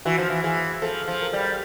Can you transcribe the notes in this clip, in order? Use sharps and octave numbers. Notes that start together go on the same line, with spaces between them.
E3 F#4
F3
E3
E3 G#4
F3 A4
F3
A#4
G3